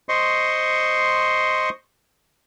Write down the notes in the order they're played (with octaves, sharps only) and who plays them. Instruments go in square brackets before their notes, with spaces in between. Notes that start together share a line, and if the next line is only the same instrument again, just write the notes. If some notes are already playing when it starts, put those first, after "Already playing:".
[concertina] C5 D#5 C6 C#6